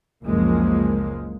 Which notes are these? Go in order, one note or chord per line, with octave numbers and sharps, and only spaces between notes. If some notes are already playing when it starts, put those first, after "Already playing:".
F#1 C#2 F3 G#3 A#3